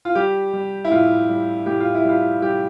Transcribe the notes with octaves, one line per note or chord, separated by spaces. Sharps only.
F4
G3 G4
G3
E4
A2 F4
G3
A2 G4
F4
E4
G3 F4
G3 G4